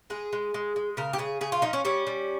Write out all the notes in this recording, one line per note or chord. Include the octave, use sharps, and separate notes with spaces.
G#3 G#4
G#3
G#3
G#3
C#3 A#4
G4
C#3 G#4
C#3 G#4
F4
F3 D#4
C#4
G3 C#4
G3